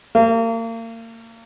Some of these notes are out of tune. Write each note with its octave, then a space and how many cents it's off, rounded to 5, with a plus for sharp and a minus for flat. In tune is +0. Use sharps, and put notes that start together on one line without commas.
A#3 -35